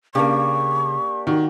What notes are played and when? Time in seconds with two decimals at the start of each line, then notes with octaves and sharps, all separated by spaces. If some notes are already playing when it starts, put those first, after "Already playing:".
0.15 C#3 A#3 D4 G4 C#6
1.27 D#3 F#4